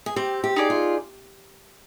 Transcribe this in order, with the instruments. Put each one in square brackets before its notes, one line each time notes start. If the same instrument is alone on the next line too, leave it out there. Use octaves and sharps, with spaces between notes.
[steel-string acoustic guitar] G#4
[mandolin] C4 [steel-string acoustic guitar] G4
[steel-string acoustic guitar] G4
[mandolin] D#4 G#4 D5
[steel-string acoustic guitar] F4